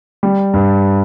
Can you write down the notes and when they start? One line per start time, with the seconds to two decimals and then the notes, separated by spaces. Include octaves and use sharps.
0.23 G3
0.54 G2